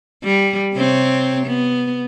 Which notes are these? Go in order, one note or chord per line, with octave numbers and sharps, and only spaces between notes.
G3
C3 C4 C#5
B3